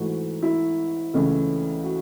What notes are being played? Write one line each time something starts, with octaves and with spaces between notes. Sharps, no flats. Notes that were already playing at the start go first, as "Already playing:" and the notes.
Already playing: G#2 E3 A3 F#4
E4
C#2 C#3 E3 A3
F#4